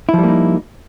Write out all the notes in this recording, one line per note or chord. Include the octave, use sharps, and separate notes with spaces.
F3 G3 A#3 D#4 E4